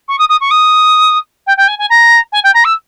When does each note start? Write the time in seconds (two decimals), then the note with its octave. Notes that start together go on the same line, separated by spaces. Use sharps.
0.08 C#6
0.19 D#6
0.29 D#6
0.41 C#6
0.51 D#6
1.47 G5
1.57 G5
1.68 G#5
1.79 G#5
1.90 A#5
2.32 G#5
2.44 G5
2.54 A#5
2.65 E6